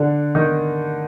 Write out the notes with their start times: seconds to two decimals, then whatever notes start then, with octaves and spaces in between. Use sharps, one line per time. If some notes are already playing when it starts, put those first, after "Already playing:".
Already playing: D3 D4
0.35 D#3 D#4